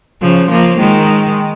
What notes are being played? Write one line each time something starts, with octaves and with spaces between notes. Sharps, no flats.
C#3 F3
F3 A#3
D#3 G#3